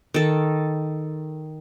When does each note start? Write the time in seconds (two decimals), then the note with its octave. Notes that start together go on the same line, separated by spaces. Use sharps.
0.14 D#3 A4